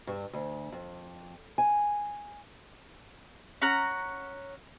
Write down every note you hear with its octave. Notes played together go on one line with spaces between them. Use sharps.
G2
D2
F2
G#5
C#4 F#5 A#5